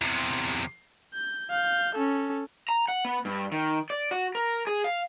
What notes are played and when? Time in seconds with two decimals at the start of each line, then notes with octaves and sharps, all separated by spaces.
0.02 E2 C3
1.14 G6
1.50 F5 G6
1.95 C#4 A4
2.69 A#5
2.88 F#5
3.05 B3
3.25 G2
3.52 D#3
3.90 D5
4.11 F#4
4.35 A#4
4.67 G#4
4.84 F5